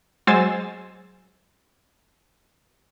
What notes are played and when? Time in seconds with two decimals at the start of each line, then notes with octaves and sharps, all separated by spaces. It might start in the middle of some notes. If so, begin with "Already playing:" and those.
0.27 F#3 G#3 C5 G#5 E6 A6